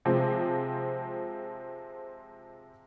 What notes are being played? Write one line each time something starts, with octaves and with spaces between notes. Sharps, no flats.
C3 F3 G#3 C4